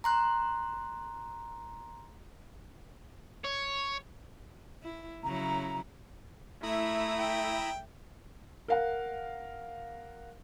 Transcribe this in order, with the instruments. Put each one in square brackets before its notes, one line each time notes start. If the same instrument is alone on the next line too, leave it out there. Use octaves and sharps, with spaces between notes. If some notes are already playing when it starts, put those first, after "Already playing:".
[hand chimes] A#5 C6 F#6
[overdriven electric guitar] C#5
[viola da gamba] E4
[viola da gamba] C#3 F#3 E4 [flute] A#5
[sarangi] A3 [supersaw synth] E4 E5 [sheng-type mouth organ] A#5 B5 D#6
[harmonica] G5
[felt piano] A#4 F5 F#5